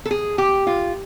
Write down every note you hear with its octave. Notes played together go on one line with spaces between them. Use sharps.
A4
G#4
G4
F4